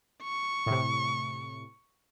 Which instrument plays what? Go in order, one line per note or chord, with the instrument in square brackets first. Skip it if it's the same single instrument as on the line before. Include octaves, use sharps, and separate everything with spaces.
[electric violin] C#6
[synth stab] A2 C3